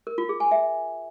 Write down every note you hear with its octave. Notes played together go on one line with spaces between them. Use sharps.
A#4
F4
G#4
G#5
E5